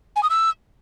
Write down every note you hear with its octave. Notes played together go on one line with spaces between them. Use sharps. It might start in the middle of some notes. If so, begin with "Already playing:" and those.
G#5
D#6
E6